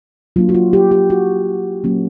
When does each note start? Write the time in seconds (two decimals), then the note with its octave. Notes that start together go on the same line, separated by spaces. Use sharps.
0.36 F#3 A#3 D4 F4
0.49 F#4
0.55 F4
0.73 G4
0.91 G4
1.10 F#4
1.84 F#3 A#3 C#4